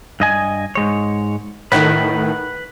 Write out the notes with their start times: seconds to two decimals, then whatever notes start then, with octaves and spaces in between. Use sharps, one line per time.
0.20 G2 D#5 G#5
0.75 G#2 G#3 C#5
1.72 A2 D#3 B4 F#5